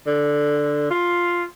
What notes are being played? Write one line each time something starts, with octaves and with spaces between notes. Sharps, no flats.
D3
F4